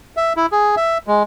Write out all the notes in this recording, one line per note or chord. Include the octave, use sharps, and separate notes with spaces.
E5
E4
G#4
E5
G#3